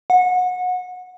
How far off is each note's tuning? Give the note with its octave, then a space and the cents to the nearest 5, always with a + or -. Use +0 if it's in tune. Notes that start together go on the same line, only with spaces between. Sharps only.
F#5 -25